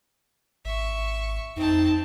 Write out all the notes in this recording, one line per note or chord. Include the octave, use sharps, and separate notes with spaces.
G#1 E5 C#6
F2 C4 D#4 A5